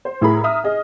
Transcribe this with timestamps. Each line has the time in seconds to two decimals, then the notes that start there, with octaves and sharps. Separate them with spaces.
0.05 C5
0.21 A2 E4 G#4 A#4 A#5 B5
0.44 E5 A#5 D#6 F6
0.64 G#4 D#5